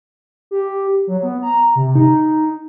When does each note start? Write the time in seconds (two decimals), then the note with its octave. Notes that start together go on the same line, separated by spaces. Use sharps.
0.51 G4
1.07 F#3
1.23 B3
1.42 A#5
1.75 C3
1.95 D#4